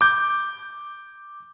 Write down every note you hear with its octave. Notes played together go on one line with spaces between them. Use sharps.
D6 G6